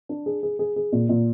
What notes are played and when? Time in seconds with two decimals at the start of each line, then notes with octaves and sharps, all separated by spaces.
0.09 D4
0.26 G#4
0.43 G#4
0.59 G#4
0.76 G#4
0.92 A#2
1.09 A#2